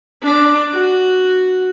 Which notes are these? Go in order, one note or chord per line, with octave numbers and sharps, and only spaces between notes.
D4 D6
F#4